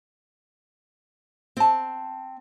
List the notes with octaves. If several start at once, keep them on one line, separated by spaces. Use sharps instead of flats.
C4 A5